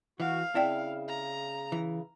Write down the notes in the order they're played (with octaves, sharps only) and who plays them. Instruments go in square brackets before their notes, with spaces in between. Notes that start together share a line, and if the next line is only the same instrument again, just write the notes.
[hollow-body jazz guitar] E3 [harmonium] F#4 [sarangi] F5
[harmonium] C#3 [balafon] C4 D5 G5 [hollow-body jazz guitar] E4
[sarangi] A#5
[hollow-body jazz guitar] E3